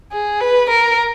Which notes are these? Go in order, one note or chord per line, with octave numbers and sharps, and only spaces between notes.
G#4
B4
A#4